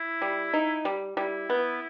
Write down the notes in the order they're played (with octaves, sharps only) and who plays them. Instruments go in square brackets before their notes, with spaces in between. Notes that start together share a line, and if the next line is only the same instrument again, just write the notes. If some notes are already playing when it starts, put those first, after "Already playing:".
Already playing: [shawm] E4
[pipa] G3
D#4
G3
[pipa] G3 [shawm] E4
[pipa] B3